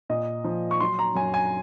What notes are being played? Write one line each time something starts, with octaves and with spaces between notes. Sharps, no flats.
A#2 D#5
F3
C#6
F#3 C6
A#5
F#2 G#5
G#5